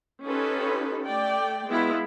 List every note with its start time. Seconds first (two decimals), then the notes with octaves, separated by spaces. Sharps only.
0.24 C#4 D#4 F4 G4 A4 B4
1.05 A3 D5 G5
1.67 G#3 B3 E4 F4